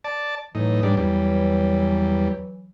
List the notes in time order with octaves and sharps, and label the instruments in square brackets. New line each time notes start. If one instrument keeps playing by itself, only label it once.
[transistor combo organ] D5 A5
[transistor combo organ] A2 D#4 [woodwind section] E3 F#3
[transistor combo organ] G#2 G3 D4
E2 G3